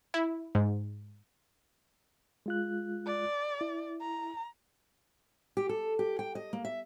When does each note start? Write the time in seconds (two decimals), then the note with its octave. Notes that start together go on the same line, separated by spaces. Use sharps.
0.14 E4
0.55 G#2
2.46 G#3 F4 F#6
3.06 D5
3.61 E4
4.01 A#5
5.57 G4
5.69 A4
5.99 G4
6.19 G5
6.35 D#5
6.53 A#3
6.65 E5